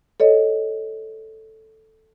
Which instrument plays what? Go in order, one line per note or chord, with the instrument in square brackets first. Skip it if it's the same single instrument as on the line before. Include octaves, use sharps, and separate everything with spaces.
[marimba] A4 C#5 D#5